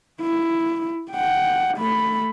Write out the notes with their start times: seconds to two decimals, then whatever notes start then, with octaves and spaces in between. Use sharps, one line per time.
0.22 E4
1.12 F#5 G5
1.77 A3 B5